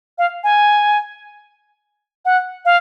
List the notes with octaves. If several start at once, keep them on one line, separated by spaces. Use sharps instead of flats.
F5
G#5
F#5
F5